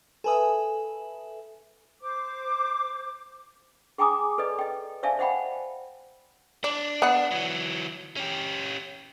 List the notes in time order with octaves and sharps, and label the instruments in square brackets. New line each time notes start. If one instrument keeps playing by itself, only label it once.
[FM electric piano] A4 B4 E5 [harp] G#5 D#6
[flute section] C5 D6
[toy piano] G#4 G5 G#5 A#5 D6 D#6
A4 B4 D5 D#5
D#5 G5
C5 D5 E5 F5 G#5 A5
C5 D#5 F#5 G5 B5
[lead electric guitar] D4 [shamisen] D5
[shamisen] B3 F#5
[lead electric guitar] E3 F#3
C#4 G4